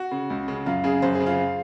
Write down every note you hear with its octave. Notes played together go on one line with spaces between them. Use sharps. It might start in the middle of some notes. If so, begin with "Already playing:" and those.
Already playing: F#4
C#3
C#2
C#3
F#2 F4
C#3 G#4
F#2 C5
G#4
C#3
F4